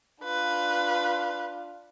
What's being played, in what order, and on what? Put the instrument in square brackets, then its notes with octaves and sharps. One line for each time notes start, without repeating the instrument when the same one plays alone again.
[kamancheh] D4 F4 [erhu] B4